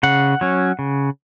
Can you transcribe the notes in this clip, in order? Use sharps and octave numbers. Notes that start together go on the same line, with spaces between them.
C#3 F#5
F#3 C#4
C#3